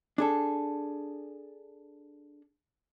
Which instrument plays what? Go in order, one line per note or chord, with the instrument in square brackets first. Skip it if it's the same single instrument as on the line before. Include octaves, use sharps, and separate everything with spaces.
[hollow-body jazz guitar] D4 G#4 A4